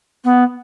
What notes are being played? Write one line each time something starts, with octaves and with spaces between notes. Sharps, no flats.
B3